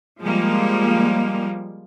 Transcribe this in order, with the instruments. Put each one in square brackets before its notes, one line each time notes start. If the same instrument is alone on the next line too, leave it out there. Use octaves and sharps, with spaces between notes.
[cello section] F3 G3 G#3 A#3